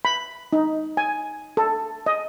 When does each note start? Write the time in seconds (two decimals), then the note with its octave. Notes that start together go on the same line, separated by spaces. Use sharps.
0.05 B5
0.53 D#4
0.97 G#5
1.57 A4
2.06 D#5